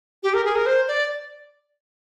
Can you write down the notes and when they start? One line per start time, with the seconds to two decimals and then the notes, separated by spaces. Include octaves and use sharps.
0.23 G4
0.34 A#4
0.45 G#4
0.56 A#4
0.66 C5
0.88 D5